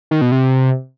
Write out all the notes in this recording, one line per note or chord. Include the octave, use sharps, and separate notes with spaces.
D#3
B2
C3